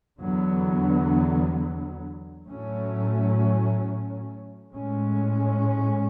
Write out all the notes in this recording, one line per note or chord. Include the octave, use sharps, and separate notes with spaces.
E2 D3 F#3 B3
A2 F#3 A3 C#4
A2 G#3 C#4